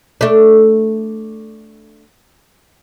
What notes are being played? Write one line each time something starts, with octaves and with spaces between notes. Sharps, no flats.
A3 D4